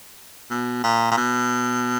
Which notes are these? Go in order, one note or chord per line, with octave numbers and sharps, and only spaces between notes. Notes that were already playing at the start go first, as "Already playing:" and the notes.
B2
A#2
A#2
B2